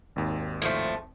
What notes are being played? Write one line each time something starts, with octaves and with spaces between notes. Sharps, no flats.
G#1 D#2
A2 F3 A3